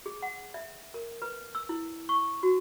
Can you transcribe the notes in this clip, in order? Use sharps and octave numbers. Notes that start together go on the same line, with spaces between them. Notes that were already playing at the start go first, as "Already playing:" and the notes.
G#4
F#5
E5
A#4
B4
E6
E4
C#6
F#4